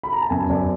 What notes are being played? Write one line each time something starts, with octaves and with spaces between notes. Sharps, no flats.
B5
A#5
A5
F#2 G#5
F#2 D5